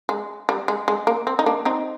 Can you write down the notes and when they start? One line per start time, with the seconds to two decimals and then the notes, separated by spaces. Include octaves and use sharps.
0.09 G#3
0.49 G3
0.68 G#3
0.88 G#3
1.07 A#3
1.27 C4
1.39 D#4
1.46 A#3 D4
1.65 C4 D#4